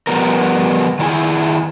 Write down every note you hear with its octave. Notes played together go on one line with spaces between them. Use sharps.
F3 G3 B3 A#4
D#3 D4 E4 G#4 G#5